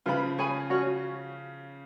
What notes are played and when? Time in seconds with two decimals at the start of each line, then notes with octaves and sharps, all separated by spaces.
0.06 C#3 F3 F4 B4 F#5 B5
0.38 G#4 C#5 G#5 B5
0.70 C#4 F#4 C#5